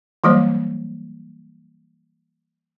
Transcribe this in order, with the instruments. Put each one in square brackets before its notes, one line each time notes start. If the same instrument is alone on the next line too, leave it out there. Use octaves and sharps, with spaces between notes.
[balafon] E3 F#3 G3 A#3 C5 D#5